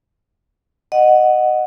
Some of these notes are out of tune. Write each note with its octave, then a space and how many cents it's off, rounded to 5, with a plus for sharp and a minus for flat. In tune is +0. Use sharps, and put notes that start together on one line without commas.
D#5 -15 F#5 +0